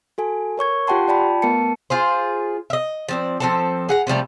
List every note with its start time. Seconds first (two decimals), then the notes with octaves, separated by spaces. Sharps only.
0.18 F#4 A4 G#5
0.58 A#4 C#5 C#6 G#6
0.87 F4 G4 F#5 G5 A5 C6
1.08 F4 D5 G5 A5 B5
1.42 A3 B3 A#4 A5 C#7
1.90 F4 G#4 C5
2.70 D#5 E5
3.09 F3 C4 D5
3.40 F3 C4 A4
3.89 G#4 F#5 A#5
4.07 C3 F3 G3 A3